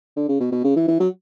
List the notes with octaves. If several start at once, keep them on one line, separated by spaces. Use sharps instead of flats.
D3
C#3
B2
B2
C#3
E3
E3
F#3